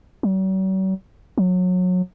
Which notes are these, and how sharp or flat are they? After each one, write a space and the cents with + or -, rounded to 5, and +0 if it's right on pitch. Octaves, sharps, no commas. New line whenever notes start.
F#3 +45
F#3 -25